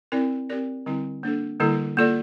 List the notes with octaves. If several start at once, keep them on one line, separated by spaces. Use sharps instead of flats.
C4 E4 A#4 D5
C4 G4 A#4 D5
D3 G3 C4 E4
A#3 D4 A4
D3 G3 A#3 E4 A4
A#3 F4 A4 D5